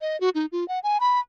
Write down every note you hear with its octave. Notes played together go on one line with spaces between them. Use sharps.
D#5
F#4
D#4
F4
F#5
G#5
B5